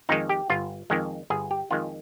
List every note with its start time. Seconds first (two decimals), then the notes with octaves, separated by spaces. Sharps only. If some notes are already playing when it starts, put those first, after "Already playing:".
0.09 F2 D#3 G#3 D#4
0.29 G4
0.50 G1 F4
0.90 F2 D#3 G#3
1.30 G1 G#4
1.51 G4
1.71 F2 D#3 G#3 F4